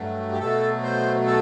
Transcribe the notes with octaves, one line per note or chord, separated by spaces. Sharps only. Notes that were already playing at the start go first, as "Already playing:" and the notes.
Already playing: G2 F#3 A3
G4
B2 F#3 A3 A4
C5
A4